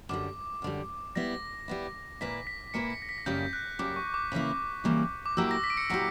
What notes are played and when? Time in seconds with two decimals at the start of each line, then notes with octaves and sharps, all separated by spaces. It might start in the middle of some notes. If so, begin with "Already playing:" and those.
0.09 F#2 D3 G3 D6
0.62 F#2 D3 G3
1.15 G3 B3 E4 A#6
1.68 G3 B3 E4
2.21 A#2 A#3 E4 B4 B6
2.47 B6
2.74 A#2 A#3 E4 B4 C#7
2.90 B6
3.02 A#6
3.09 B6
3.18 A#6
3.26 F#2 C#3 G3 A#3 G6
3.53 F#6
3.79 F#2 C#3 G3 A#3 D6
3.96 C#6
4.14 D6
4.32 C#3 E3 G3 A#3 E4
4.84 C#3 E3 G3 A#3 E4
5.26 D6
5.37 A#2 F#3 A#3 E4 G4 E6
5.51 A#6
5.64 B6
5.70 D7
5.77 C#7
5.90 A#2 F#3 A#3 E4 G4